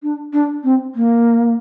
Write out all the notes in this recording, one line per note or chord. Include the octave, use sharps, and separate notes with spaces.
D4
D4
C4
A#3